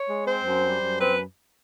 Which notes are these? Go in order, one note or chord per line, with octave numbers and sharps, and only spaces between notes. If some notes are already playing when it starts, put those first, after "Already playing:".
Already playing: C#5
G#3
C4 C5
F#2
G3
F#2
C4 B4